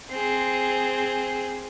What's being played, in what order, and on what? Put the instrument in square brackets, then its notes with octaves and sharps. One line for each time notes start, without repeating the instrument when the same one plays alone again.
[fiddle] C4 G#4